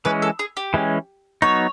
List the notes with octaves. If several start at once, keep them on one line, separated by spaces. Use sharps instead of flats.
E3 G#3 C#4 B4
A4
G#4
G4
E3 G#3 C#4
F#3 B3 D#4 C#5